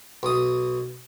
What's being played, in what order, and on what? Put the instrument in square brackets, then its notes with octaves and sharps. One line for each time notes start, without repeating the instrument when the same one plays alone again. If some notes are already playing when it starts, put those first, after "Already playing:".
[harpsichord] B1 D#6